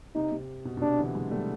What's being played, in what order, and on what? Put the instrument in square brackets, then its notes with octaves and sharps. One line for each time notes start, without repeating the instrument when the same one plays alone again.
[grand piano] C3 [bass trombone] D#4
[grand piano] C3
B2
B2
[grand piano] C3 [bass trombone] D4
[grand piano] D3 E3
F#3 G#3
G3 A3